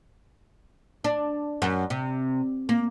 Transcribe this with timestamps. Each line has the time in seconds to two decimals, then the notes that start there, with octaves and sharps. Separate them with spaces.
1.04 D4
1.62 F#2
1.90 C3
2.69 A#3